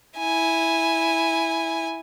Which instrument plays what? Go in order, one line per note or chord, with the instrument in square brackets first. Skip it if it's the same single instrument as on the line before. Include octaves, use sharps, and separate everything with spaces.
[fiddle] E4 G#5